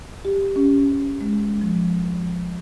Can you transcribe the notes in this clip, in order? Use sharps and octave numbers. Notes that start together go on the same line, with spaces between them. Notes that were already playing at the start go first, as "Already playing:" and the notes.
G4
C#4
G#3
F3